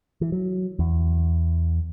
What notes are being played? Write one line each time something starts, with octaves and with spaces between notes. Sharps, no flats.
E3
F#3
E2